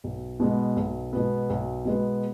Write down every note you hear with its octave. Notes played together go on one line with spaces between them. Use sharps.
B1
B2 G#3 B3
B1
B2 G#3 B3
B1
B2 G#3 B3